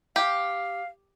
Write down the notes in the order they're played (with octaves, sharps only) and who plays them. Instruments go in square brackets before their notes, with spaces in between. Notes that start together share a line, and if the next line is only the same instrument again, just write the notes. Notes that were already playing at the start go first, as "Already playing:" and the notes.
[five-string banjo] G4 [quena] F5